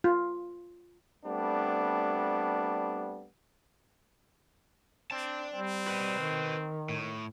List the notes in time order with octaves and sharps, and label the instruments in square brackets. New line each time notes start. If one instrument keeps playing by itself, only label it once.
[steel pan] F4
[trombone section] G3 A3 B3 C4 D4
[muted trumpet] C4 [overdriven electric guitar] D5 A5
[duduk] G3 [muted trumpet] C4
[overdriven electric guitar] B4 D#5
[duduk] D#3
[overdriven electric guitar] A2